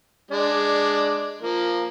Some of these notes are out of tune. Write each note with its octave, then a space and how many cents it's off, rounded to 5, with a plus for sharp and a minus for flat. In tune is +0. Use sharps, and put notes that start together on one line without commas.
G#3 +0 D4 +10 D5 +0
F3 +0 A#3 +0